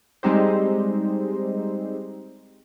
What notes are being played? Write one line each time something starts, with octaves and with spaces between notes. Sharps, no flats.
G3 G#3 C4 D#4 G4 C5